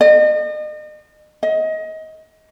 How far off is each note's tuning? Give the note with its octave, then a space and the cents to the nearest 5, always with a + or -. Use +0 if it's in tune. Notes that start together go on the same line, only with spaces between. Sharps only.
D#5 -40
D#5 +25